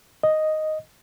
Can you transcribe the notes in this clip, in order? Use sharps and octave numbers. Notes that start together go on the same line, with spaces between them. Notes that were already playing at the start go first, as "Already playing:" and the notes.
D#5